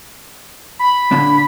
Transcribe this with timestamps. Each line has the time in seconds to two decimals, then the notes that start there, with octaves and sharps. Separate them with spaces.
0.79 B5
1.11 A#2 D3 D4